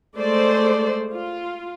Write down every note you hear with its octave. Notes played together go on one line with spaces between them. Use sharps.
G#3 A3 C5 D5
F4